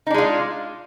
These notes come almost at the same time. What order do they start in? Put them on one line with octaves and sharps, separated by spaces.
D#4 D4 G#3 F4